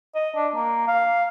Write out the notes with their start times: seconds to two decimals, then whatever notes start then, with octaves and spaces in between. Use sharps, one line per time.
0.15 D#5
0.36 D4
0.55 A#3
0.88 F5